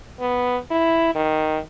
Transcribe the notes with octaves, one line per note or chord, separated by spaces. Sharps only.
B3
E4
D#3